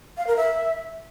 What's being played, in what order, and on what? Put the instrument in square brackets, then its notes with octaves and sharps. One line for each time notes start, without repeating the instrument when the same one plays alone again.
[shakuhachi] F5
A#4
E5